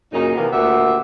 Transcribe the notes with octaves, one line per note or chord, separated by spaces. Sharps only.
F#2 A#2 C#3 D#4
C3 E3 A#3 B3
D2 A#2 D#3 G4 E5 F#5